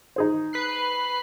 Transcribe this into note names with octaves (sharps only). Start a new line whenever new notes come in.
D#4 G#4 C5
B4 F#6 C7